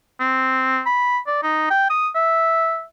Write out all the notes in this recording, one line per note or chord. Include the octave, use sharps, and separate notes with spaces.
C4
B5
D5
D#4
G5
D#6
E5